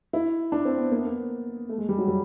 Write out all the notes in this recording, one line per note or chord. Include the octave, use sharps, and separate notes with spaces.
E4
D4
C4
B3
A#3
B3
A#3
A3
G#3
G3
F#3
G3